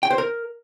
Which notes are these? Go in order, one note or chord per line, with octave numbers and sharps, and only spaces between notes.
G5
C5
A#4